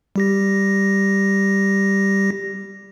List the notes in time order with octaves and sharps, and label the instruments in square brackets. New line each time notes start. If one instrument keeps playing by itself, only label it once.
[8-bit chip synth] G3 G4 A#6